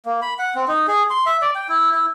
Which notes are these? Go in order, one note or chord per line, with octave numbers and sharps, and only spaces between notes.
A#3
B5
F#5
C4
D#4
G#4
C6
E5
D5
G5
E4
E4